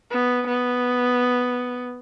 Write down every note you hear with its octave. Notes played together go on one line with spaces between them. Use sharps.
B3
B3